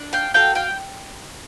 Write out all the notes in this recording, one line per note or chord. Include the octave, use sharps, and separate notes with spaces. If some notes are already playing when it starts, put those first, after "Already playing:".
Already playing: D4
F5 G5
F#4 A4 F5 G5
F5 G5